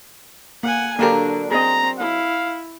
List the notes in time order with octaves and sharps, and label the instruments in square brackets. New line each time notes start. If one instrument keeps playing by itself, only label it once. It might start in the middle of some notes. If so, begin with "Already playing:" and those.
[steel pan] A#3 [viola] F#5 G#5
[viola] D3 [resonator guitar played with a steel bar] F#3 D4 A#4 [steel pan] A#3 G4
[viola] C4 [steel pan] G#4 D#5 [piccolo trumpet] A#5
[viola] E4 [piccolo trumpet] F5